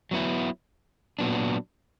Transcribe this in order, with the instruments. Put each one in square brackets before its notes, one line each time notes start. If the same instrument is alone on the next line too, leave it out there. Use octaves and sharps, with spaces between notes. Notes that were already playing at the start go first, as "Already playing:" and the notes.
[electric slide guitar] F#3 B3 E4
A#2 F#3 B3 D4